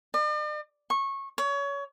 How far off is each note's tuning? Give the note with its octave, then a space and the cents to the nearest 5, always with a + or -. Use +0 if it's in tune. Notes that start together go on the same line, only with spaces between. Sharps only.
D5 +45
C#6 -20
C#5 +25